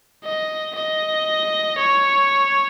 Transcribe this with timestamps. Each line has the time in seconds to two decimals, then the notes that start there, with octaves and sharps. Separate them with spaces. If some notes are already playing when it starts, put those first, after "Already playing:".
0.24 D#5
0.75 D#5
1.79 C#5